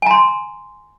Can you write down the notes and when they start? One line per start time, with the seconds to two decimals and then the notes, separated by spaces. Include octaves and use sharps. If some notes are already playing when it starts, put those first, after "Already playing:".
0.02 G#5
0.07 A#5
0.11 C6